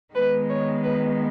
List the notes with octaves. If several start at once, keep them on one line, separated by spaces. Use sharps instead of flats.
D#3 G#3 B3 B4
C#5
B4